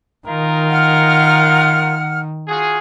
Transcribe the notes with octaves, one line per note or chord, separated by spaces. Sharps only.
D#3 D#4 F4 A#4
F#5 F6
F4 F#4 G#4